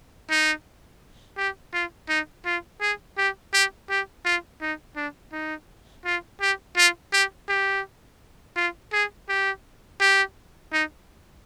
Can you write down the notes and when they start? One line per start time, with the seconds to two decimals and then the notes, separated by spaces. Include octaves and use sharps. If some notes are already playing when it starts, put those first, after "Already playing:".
0.30 D#4
1.37 G4
1.73 F4
2.09 D#4
2.45 F4
2.81 G#4
3.18 G4
3.53 G4
3.90 G4
4.25 F4
4.61 D#4
4.96 D4
5.32 D#4
6.05 F4
6.41 G4
6.77 F4
7.12 G4
7.49 G4
8.56 F4
8.93 G#4
9.29 G4
10.01 G4
10.73 D#4